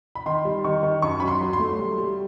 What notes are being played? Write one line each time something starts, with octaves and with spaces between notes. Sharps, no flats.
B5
D#3 C6
G3
D#3 C#6
D#3
F#2 C#6
F#3 B5
C6
F#3
C6
A3
G3
G3